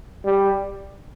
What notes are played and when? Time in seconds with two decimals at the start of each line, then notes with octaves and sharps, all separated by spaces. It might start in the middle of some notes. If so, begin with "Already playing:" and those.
0.24 G3